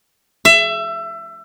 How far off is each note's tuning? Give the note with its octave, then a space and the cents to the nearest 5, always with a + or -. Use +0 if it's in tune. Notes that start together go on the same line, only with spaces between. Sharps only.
E5 +25